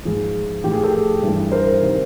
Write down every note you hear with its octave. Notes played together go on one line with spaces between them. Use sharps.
G#2 F3 G#4
A2 F3 G4
G#4
G4 A4
G2 E3
A#4 C5
C3 D#3